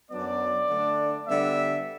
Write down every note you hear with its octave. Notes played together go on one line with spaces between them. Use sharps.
F#2 F#3 B3 D4 D5
D3 A3 D4
D3 G3 B3 D4 E5